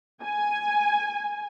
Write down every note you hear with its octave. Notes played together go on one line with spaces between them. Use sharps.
G#5